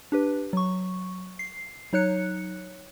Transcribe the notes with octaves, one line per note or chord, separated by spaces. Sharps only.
D4 G4 B4
F#3 C#6
C7
F#3 D#4 C#5 F#6 C#7